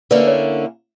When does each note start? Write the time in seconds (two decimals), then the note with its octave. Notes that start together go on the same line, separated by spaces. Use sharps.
0.11 D3 A#3 C#4 E4 B4 D5
0.27 C#5